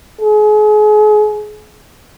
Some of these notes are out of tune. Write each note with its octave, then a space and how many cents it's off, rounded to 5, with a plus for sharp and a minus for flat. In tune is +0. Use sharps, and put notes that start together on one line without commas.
G#4 +35